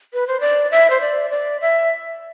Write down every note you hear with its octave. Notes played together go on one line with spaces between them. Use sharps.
B4
C5
D5
E5
C5
D5
D5
E5